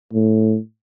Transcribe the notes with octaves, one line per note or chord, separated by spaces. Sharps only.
A2